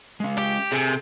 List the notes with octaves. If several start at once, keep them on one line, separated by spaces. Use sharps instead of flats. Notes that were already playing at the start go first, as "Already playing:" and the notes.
G#3 C#4
G4
C3 G#4 A4 G#5